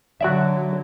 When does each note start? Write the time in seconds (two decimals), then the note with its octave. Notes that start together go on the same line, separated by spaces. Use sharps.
0.21 D3 F#3 F#4 D5 E5